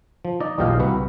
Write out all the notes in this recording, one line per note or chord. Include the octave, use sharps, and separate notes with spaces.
F3
D#4 D5 D#5
B1 E2 A#2 G4 D#5 F5
C2 F#4 B4 F#5